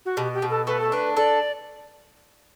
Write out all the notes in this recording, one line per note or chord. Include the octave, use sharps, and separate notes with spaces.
F#4
B2 G4
G4
B2
A4
A3 B4
A4
D4 B4
A4 D5